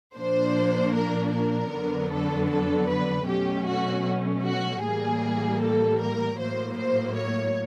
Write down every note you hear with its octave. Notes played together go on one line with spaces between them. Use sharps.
A#2 F3 A#3 D4 C5
A#4
A#4
F2 D3 F#3 B3 D4
A4
A4
B4
B2 F#3 A3 C#4 G4
F#4
F#4
A2 E3 G3 A#3 G#4
A4
A#4
A2 F#3 A#3 C5
C5
C#5